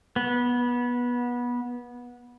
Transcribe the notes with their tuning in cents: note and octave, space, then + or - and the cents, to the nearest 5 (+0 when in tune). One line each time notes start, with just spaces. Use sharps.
B3 -20